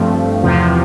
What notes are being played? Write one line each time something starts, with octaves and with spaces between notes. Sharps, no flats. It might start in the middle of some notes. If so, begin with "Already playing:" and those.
Already playing: G2 F3 A3 C4
E2 C3 F3